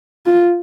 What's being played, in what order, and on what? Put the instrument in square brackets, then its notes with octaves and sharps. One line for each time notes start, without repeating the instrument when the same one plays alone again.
[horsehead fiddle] F4